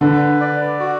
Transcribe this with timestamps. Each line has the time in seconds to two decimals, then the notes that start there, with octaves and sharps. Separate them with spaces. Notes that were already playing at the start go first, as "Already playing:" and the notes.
0.01 D3 B4
0.40 D5
0.80 F#4